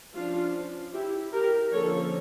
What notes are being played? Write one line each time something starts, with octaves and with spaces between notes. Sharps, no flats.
F3 C#4 D4 F4
E4 G4
G4 A#4
D3 F3 A#3 C#4 A4 C#5